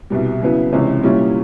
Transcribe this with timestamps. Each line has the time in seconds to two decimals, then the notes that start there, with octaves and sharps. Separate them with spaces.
0.10 C2 B2 G3
0.41 C#3 F#3 B3 E4
0.72 C#2 C3 E3 G#3 C#4
1.03 A#2 G3 A#3 C#4 E4